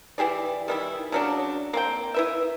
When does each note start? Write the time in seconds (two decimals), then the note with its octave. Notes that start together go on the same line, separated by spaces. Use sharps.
0.18 E3 G4 G#4 D5
0.68 D#3 G3 E4
1.12 C#3 F#3 D4
1.73 A#3 C4 G5
2.14 E4 B4 E5